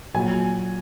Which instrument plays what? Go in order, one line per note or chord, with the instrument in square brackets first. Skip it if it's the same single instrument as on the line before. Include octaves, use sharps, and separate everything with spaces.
[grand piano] A#2 F#3 G#5